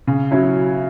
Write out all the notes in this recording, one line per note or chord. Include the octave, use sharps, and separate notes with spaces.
C#3
F#3 C#4 E4